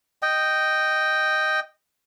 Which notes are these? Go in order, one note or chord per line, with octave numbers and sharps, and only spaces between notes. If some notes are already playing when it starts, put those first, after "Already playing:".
D#5 G5